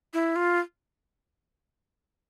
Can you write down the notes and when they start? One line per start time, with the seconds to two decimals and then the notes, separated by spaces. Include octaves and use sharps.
0.14 E4
0.36 F4